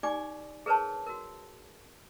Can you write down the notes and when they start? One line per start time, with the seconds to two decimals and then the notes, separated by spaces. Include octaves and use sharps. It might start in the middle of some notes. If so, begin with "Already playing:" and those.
0.03 D#4 G4 D5 G#5 D6
0.66 G#4 A#4 B4 C#5 A5
1.07 F#4 A#4